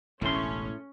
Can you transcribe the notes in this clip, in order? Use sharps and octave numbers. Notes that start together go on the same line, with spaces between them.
E1 A1 A2 A3 C#4 C6